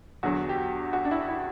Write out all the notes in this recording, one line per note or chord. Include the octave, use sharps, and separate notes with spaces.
E2 D3 F#3 F#4
G4
F#4
D4
E4
E4